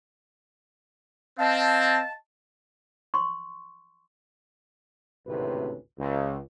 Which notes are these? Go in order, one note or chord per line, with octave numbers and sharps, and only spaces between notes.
C4 D#5 F5 A5
C6 C#6
G#1 D2 A2 C3 C#4 B4
C#2